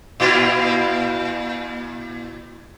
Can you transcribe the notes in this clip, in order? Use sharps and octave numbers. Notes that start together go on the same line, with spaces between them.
A#2 E4 F4